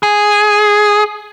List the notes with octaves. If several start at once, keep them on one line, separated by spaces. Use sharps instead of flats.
G#4